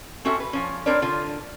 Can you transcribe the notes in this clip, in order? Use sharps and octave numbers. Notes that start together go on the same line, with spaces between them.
C4 C#4 F#4 A4 E5
B4
F3 C#4
C4 D4 A#4 B4 C#5 D5
D3 F4